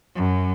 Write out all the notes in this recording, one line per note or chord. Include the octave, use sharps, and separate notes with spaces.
F#2